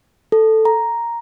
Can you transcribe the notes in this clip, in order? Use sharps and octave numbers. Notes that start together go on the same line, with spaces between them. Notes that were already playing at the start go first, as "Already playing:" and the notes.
A4
A#5